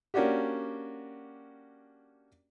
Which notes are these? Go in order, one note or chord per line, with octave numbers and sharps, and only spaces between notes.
A#3 C#4 D4 F#4 G4